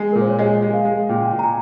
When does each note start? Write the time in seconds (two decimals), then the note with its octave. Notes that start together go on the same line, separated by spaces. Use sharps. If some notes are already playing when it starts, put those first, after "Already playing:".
Already playing: G#3
0.12 A#2 A#4
0.21 C5
0.30 C#5
0.39 G#3 D#5
0.62 G#3
0.73 F5
0.85 G#3
1.09 A#2 G5
1.32 A#2
1.39 A#5
1.43 G#5